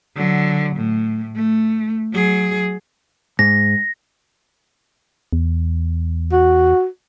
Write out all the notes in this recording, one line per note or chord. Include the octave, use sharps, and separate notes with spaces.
D3 F#3
A2
A3
F#3 G#4
G#2 A#6
E2
F#4